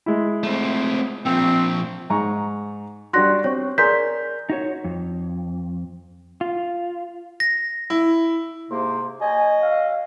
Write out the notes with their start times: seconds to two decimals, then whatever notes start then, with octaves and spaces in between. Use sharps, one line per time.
0.06 G#3 E4
0.43 A3 C4
1.25 A#2 F3 C4
2.10 G#2 A#5 C#6
3.13 G3 D4 F#4 C6 F#6 A#6
3.44 C4 C#5 C#6
3.78 G#4 A#4 D5 C6 G6 B6
4.50 D#4 F#4 C#5
4.84 F2
6.41 F4
7.40 A#6
7.90 E4
8.71 G#2 C3 A#3 C5
9.21 F#3 F#4 D#5 G#5
9.62 F5